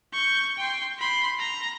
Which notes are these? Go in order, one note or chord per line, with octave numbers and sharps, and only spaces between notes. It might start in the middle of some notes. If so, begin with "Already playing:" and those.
C#6 G6
G5 C6
B5 C6
A#5